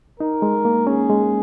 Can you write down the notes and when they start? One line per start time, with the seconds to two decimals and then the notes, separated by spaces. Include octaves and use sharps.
0.20 D#4 A#4
0.42 G#3
0.65 A#3
0.87 C#4 G#4
1.10 G#3